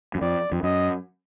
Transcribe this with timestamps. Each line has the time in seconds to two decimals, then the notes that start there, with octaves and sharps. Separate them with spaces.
0.15 F#2
0.21 F2 D5
0.52 F2
0.63 F#2 D#5